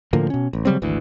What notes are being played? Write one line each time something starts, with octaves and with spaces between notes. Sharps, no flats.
A2 D3 F3 A#3
B2 C#4
A1
C#3 F#3 G3 C4
G#1 D2 E3